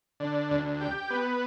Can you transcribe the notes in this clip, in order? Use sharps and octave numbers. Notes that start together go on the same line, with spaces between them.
D3
D2
G4
B3